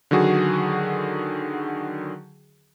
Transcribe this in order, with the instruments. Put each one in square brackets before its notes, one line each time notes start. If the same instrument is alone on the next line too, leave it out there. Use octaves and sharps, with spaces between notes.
[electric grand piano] D3 D#3 F#3 F#4 G#4